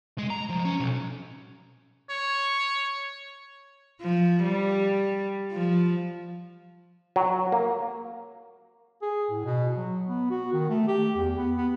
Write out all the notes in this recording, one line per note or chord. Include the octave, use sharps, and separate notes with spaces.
G#3
A#5
F3
C#4
B1
C#5
F3
G3
F3
F#3
A#3
G#4
A2
B2
F#3
B3
F#4
D#3
A3
G4
E2
B3
B3